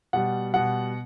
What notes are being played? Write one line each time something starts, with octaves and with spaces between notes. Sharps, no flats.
B2 G3 F#5
B2 G3 F#5